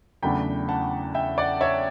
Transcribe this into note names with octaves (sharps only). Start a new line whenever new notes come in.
E2 C#3 F#3 A3 D4 G5 B5
F#5 A5
E5 G5
D5 F#5
C#5 E5